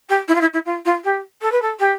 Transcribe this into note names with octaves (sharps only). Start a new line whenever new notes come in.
G4
E4
F4
E4
E4
F4
F4
G4
A4
B4
A4
G4